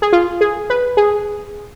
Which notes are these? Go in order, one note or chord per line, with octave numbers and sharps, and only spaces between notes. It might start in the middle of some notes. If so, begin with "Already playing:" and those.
G#4
F4
G#4
B4
G#4